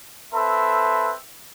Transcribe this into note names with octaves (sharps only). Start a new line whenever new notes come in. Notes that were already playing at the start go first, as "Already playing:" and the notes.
C4 A4 B4 E5